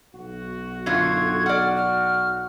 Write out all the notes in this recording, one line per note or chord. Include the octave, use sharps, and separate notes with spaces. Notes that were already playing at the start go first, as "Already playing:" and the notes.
B1 F#4
F#2 D3 F4 G#6
D5 F#5 F6
F6